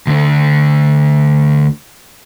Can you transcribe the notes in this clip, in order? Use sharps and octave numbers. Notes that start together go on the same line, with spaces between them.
D2 D3